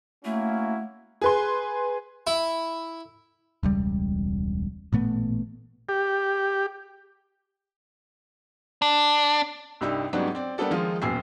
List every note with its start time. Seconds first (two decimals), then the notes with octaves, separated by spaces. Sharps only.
0.25 A3 A#3 C#4 E4 F#4
1.21 G#4 B4 C6
2.27 E4
3.63 E1 C#2 G3
4.93 A1 A#2 A3 B3
5.89 G4
8.82 D4
9.81 C2 G2 G3 D#4 G4 E6
10.13 G#2 F#3 G3 B3 C#4 D4
10.35 C4 D5
10.58 G3 A#3 B3 D4 A4 D5
10.71 D#3 F3 G#3 D#4 F4
11.02 E1 A#1 F#2 G5 C7